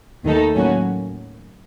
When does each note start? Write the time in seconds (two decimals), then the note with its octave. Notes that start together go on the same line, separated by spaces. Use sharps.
0.24 D#2 D#3 A3 D#4 A4
0.55 A2 F#3 A#3 C#4 F#4